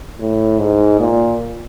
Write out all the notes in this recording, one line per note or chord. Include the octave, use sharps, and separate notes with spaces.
A2
G#2
A#2